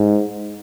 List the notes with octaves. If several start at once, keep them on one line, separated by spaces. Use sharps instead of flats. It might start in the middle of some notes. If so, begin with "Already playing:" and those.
Already playing: G#2